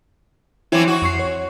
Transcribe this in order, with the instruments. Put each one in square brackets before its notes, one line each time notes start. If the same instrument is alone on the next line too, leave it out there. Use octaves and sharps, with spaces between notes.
[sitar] E3 F#3 C4 [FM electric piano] E4
[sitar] F#4
[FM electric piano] F2 C#6 C7
C#5